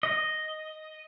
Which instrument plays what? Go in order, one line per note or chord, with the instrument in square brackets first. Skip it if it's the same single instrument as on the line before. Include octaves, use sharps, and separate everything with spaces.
[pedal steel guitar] D#5